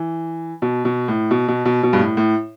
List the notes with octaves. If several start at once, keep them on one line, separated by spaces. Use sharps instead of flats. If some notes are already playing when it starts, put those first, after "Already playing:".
Already playing: E3
B2
B2
A2
B2
B2
B2
B2
G2
A2
A2